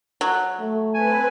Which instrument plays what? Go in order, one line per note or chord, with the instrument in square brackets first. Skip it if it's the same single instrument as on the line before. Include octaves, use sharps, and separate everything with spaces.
[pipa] F#3
[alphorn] A3
[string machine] C4 B4 [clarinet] G#5